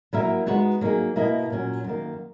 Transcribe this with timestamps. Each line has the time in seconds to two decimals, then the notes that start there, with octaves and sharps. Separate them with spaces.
0.13 F#3 A#3 E4 A#4 E5
0.46 G#3 B3 D#4 F#4 B4
0.81 F#3 A#3 D#4 G#4
1.16 B2 A#3 E4 B4 D#5
1.50 A#2 F#3 C#4
1.84 F#2 D#3 A#3